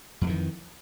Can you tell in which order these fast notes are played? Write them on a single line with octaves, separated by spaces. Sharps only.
F2 G#3 E3 D#3